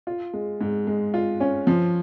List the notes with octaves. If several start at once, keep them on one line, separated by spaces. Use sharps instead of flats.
F4
G#3
G#2
G#3
F4
C#4
F3